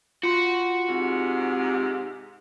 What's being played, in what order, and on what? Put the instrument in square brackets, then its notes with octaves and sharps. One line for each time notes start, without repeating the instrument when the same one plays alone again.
[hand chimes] F4 C6 [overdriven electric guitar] F#4
[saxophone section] G#2 C3